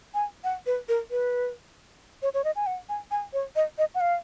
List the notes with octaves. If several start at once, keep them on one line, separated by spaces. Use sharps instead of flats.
G#5
F#5
B4
A#4
B4
C#5
C#5
D#5
G#5
F#5
G#5
G#5
C#5
D#5
D#5
F#5
F5